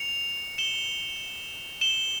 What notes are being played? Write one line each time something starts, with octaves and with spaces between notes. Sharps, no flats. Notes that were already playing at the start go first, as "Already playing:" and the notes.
Already playing: C#7 F7
E7 G7
E7 G7